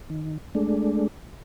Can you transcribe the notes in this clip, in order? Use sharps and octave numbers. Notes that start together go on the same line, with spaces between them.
D#3
G#3 A3 D4